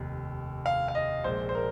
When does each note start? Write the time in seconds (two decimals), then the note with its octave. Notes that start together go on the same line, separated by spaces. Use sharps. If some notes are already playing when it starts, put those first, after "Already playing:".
Already playing: F1 D#2 A#3
0.66 F5
0.88 F5
0.95 D#5
1.24 A#1 A#2 G#3 C5
1.49 C5
1.55 A#4